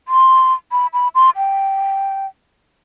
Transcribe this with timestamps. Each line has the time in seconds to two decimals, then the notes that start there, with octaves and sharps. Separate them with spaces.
0.08 C6
0.72 B5
0.93 B5
1.15 C6
1.37 G5